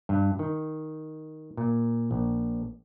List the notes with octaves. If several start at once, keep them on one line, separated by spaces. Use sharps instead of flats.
G2
D#3
A#2
A#1